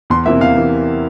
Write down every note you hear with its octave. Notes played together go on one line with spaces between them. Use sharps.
E2 C6
C3 E3 A#3 E5
E2 F5
C3 E3 A#3